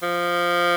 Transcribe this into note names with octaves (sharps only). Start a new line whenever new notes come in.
F3